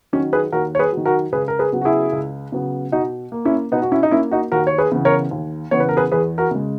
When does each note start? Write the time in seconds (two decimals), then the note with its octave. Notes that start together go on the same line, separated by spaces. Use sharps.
0.13 D#3 F#3 C#4
0.33 G#4 B4
0.52 D#2 F#4 A#4
0.75 C#5
0.79 G#4 B4
0.92 D#3 F#3
1.05 F#4 A#4
1.32 C#2 G#4 B4
1.48 A#4
1.59 G#4 B4
1.72 C#3 F#3 B3
1.81 F#4
1.85 E4 G#4
2.12 C#2
2.52 C#3 F#3 B3
2.92 B2 D#4 F#4
3.32 A#3
3.45 C#4 E4
3.72 B2 B3 D#4
3.82 F#4
3.92 C#4 E4
4.03 D#4
4.11 A#3 C#4 E4
4.31 D#4 F#4
4.52 D#2 F#4 A#4
4.67 C#5
4.78 G#4 B4
4.92 C#3 E3 B3
5.05 A#4 C#5
5.31 D#2
5.71 C#3 E3 B3 C#5
5.80 B4
5.89 A#4
5.97 G#4 B4
6.12 E2 G#4 B4
6.38 F#4 A#4
6.51 C#3 G#3